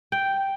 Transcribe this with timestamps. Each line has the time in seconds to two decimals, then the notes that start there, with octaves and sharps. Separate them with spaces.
0.12 G5